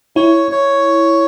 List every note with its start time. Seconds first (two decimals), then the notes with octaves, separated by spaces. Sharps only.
0.16 E4 C#5
0.51 C#5